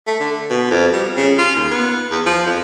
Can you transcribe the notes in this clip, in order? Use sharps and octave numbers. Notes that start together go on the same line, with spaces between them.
A3
D3
B2
F2
G3
C#3
F4
D#2
B3
E2
F3
F2